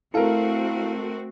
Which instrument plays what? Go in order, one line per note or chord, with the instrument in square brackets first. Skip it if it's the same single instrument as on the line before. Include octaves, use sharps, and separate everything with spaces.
[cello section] A3 C4 F#4 [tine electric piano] E4 F5 [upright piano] A4 A#4